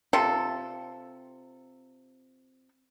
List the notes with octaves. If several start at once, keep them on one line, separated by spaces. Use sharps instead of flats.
C3 F4 A4